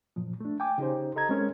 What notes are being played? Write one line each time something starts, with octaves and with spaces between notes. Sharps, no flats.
F#2 A#2 F3
A3 D4
G5 G#5 D6
C#3 D#4 G4 C5
A4 D#5 A#5 G#6
G#3 C4 C#4 A#4